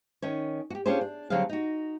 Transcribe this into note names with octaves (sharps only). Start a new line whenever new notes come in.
D#3 C#4 C#5
F#4 G4
C#4 D4 F4 G4 G#4 C5
D4
D3 F#3 G3 C4 G#4 F5
D#4 F#4